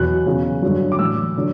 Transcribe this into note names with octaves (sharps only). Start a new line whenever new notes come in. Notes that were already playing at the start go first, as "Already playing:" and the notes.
Already playing: E2 B2 F#3 F#6
E2 C#3 F#3
G2 D3 F#3
D6
A2 E3 E6
D3 F#3